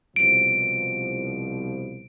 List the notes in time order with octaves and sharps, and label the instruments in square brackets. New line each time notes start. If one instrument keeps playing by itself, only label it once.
[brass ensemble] C2 B2 F3 [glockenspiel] D7